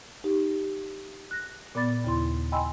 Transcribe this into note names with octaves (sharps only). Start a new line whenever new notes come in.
D#4 G4
F#6 A#6
A#2 B3 D5 B5 D6 A6
D#2 C#3 E4 C6
D#5 G5 G#5 B5 C6 E6